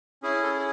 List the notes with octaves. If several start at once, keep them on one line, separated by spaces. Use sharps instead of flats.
C#4 E4 G#4
A4